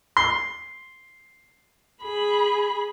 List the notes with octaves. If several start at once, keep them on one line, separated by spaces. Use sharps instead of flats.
C6
G#4 B5